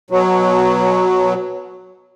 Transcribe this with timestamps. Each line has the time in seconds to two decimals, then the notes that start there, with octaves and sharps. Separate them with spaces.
0.10 B2 F#3